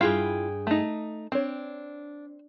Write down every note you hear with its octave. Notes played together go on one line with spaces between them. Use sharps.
G2 E4 F4 G#4 F5 G5
A3 D#4
C4 D4 C#5